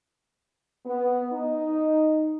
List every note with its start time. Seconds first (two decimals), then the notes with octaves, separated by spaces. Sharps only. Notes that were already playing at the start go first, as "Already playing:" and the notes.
0.85 B3
1.33 D#4